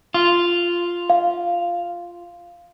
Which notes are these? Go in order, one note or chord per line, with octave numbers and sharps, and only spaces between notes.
F4
F5